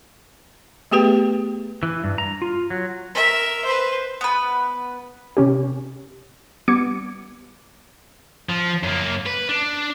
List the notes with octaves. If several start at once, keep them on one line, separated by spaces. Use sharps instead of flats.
A3 B3 G4 G#4 B4 G5
E3
G2
A#5
F4
F#3
A#4 E5
B4 C5
B3 B4
C3 C#4 G4
G3 B3 D6 G#6 C#7
F3
F#2 A#3
B4
D4